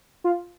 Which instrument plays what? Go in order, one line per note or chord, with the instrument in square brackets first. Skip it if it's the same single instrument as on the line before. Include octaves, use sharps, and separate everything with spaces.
[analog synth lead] F4